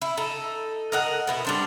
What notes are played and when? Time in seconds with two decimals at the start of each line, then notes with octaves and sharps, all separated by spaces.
0.02 E4
0.17 D#4 A4
0.92 A#4 D#5 F#5
1.27 B2 B3 E4
1.45 G3 D4 C5